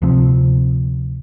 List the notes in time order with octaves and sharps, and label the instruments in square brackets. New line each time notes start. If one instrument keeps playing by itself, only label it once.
[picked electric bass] D2 C3 F3 C4